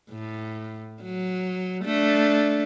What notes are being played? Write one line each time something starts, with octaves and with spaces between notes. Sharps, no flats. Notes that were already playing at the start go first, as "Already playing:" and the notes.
A2
F#3
A3 D4